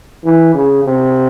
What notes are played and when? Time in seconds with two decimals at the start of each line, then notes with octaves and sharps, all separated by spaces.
0.25 E3
0.54 C#3
0.84 C3